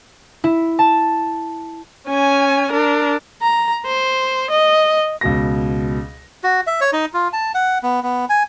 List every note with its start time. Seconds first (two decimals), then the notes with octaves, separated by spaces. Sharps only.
0.44 E4
0.79 A5
2.08 C#4 G#5
2.72 D4 A#4
3.41 A#5
3.86 C5
4.50 D#5
5.21 C#2 B2 A#6
6.43 F#4
6.67 E5
6.81 C#5
6.93 D#4
7.14 F4
7.33 A5
7.55 F#5
7.83 B3
8.03 B3
8.29 G#5